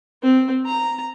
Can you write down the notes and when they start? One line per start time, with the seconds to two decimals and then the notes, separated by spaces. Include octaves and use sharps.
0.23 C4
0.66 A#5